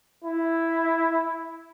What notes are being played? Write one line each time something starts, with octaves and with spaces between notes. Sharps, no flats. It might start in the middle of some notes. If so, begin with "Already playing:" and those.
E4